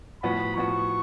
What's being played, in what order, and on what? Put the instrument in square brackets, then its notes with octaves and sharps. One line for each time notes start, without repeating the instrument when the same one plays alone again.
[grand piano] A2 F3 B3 F#4 [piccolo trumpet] B5
[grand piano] A2 F3 B3 F#4 [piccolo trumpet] C#6